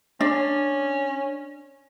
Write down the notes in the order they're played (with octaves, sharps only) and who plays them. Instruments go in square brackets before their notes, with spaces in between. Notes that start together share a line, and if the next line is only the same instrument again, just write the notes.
[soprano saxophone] C#4 [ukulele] D4